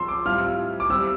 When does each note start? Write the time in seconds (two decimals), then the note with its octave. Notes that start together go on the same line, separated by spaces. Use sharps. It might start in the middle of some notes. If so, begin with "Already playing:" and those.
Already playing: F3 C4 F4 C6 E6
0.08 D6
0.25 A2 G3 C4 F4 F6
0.80 D6
0.89 G3 C4 G4 E6